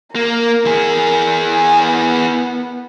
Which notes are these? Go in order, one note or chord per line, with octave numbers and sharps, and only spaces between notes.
A#3 A#4
E3 G#4
G#5
B3